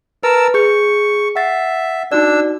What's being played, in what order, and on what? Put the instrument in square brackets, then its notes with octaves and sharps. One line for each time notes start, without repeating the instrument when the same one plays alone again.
[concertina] A#4 A5 E6 [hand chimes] B4 B5
[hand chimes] G#4 G6 [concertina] C#6
[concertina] E5 [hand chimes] F#5 A6 C7
[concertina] D4 E6 [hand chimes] D#4 F#4 D5